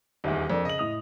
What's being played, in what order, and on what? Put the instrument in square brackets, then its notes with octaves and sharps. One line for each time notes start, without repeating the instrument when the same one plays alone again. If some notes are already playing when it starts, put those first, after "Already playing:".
[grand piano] D#1 E2 [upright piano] D#4 E5
[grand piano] F2 [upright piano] D4 A#4 D5
[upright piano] C#3 [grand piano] D#5 F#7
[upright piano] A2 D#6 F7